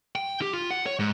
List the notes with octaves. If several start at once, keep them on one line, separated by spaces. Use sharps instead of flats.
G5
G4
F4
F#5
C#5
G#2